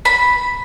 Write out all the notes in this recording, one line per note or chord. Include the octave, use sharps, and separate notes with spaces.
B5